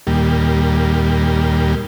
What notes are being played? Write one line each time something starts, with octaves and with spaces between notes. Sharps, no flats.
D#2 A#2 G3